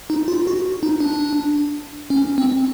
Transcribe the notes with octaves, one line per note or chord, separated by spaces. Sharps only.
D#4
F4
F#4
D#4
D4
C#4
C4